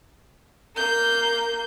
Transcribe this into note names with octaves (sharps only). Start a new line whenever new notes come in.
A#3 G6